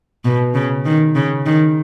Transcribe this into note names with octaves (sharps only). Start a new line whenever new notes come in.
B2
C#3
D#3
C#3
D#3